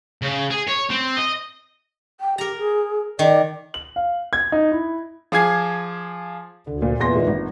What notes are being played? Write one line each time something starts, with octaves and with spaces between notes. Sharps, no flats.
C#3
G#4
C#5
C4
D#5
G5
G4 A#4 A#5
G#4
D#3 D5
F#7
F5
G#6
D#4
E4
F3 G#4 D6 G#6 C7
D2 D3
A#2
E2 A#2 E3 C6 A#6
G#2
G#1